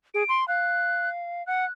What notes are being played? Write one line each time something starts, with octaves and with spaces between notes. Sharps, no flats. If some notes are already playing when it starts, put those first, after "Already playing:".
G#4 D7
C6
F5 F#6
F#5 F#6